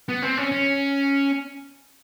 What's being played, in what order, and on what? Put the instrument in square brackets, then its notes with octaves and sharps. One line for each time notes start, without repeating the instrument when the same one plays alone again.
[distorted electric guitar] B3
C4
C#4
C#4